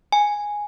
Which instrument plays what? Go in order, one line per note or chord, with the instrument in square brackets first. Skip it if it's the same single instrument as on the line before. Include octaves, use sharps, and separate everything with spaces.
[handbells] G#5